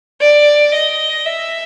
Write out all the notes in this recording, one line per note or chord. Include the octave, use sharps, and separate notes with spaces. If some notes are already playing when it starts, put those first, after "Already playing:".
D5
D#5
E5